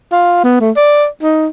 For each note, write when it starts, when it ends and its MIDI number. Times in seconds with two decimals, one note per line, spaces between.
0.12 0.41 65
0.44 0.56 59
0.60 0.71 57
0.77 1.06 74
1.23 1.47 63